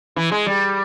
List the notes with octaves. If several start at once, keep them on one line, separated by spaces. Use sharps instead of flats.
E3
G#3
G3